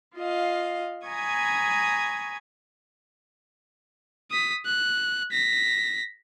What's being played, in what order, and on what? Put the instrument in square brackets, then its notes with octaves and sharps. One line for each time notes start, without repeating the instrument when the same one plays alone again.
[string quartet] F4 D#5 F5
G#5 A#5 B5 C#6 D#6 G#6
[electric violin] D#6 B6
F#6
A#6 B6